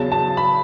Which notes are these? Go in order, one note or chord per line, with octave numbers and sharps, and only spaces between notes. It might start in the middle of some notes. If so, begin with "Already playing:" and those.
Already playing: E2 C#3 F#3 A5
A5
B5